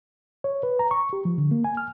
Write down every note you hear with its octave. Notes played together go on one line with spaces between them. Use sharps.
C#5
B4
A#5
C#6
G4
F3
D3
A#3
G#5
F6